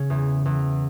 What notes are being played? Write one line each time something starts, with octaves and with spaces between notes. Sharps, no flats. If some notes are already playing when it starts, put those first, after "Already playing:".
Already playing: C#3 C#4
E2
E2